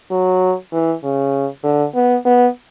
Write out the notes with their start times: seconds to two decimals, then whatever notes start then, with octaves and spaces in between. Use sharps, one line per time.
0.11 F#3
0.72 E3
1.03 C#3
1.64 D3
1.94 B3
2.25 B3